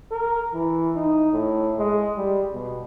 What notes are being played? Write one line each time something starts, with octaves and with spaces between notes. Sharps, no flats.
A#4
E3
D#4
A2
G#3
G3
B2